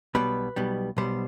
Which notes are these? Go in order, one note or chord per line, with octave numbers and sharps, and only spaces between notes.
B1 B2 G3 B3 B4
B1 B2 G3 B3
B1 B2 G3 B3 C5